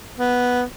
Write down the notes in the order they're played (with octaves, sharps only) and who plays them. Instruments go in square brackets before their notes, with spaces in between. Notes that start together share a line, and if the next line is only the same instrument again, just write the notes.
[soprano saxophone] B3